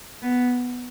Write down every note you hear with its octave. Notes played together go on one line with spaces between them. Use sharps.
B3